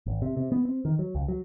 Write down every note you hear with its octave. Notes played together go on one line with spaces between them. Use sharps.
G#1
C3
C3
B3
C4
D#3
F#3
C#2
F#3